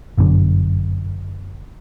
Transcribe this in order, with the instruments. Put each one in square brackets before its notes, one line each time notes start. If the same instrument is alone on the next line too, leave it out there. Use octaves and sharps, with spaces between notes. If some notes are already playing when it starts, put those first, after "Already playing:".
[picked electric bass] G1 F#2 B2 D3